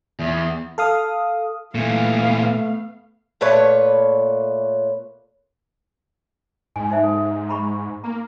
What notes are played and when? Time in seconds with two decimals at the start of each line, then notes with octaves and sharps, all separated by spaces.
0.19 E2
0.78 A4 F5 D#6
1.75 A#2 E3 A3 B3 F5
3.41 A#2 A3 B4 C#5
6.76 G#2 G#5
6.90 D#4 C5 E5
7.04 A4
7.49 A#5 B5 C#6
8.04 A#3 A#5